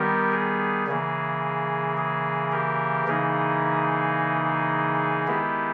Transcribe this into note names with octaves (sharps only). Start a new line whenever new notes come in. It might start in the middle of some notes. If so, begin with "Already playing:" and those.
Already playing: D#3 G3 B3 G4 A#4
G#4
C#3 E3 A#3 G#4
G#4
G4 A#4
C#3 E3 A#3 D#4 G#4
D#3 G#3 B3 E4 G4